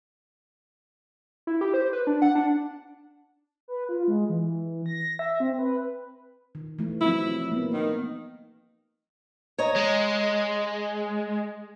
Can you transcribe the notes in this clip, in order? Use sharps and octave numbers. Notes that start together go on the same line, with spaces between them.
E4
G4
C5
B4
D4
F#5
D4
B4
F4
G#3
E3
A#6
E5
C4
B4
D#3
E3 A3
F3 F#3 C4 E4
A#3 B3
D#3
C#5 D#5 A#5
G#3